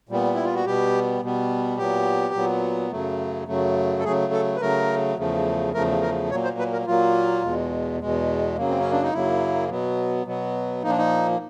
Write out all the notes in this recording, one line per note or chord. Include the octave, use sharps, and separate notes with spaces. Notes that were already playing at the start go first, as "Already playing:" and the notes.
A#2 G3 B3
E4
F4
F#4
B2 G3 B3 G4
B2 G3 B3
A#2 F#3 B3 G4
A#2 F#3 B3
F#2 C#3 F#3 A3
F#2 C#3 F#3 A3
A4
C#3 F#3 A3 G#4
A4
B4
C#3 F#3 A3 A#4
E2 C#3 F3 A3
E2 C#3 F3 A3 A#4
A#4
A#2 F#3 A#3 C#5
C5
B4
A#4
A#2 F#3 A#3 F4
E2 B2 G#3
E2 B2 G#3
F#2 C#3 F#3 A#3
C4
C#4
D4
D#4
F#2 C#3 F#3 A#3 E4
B2 F#3 B3
B2 F#3 B3
A#2 F3 A#3 D#4
D4
D#4